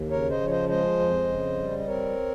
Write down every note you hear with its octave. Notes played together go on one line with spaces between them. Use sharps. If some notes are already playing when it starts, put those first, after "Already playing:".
Already playing: D#2
C#3 A#4 C#5
C5 D#5
F3 C#5
C5 D#5
G#3 C5 D#5
F2
C#3
G3
D#5
C4 A#4 C#5